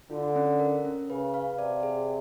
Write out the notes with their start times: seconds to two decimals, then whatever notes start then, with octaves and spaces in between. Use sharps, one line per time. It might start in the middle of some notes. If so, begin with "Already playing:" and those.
0.10 D3 F4
0.36 C#4
0.60 A#4
0.85 C#4
1.10 C#3 B4
1.34 F5
1.58 C3 D5
1.83 G#4